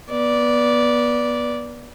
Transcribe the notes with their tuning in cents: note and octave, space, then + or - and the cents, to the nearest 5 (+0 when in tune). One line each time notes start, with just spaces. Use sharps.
B3 -25 D5 -10